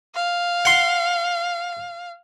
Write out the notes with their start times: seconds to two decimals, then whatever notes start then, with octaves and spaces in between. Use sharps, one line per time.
0.15 F5
0.65 F#5 C6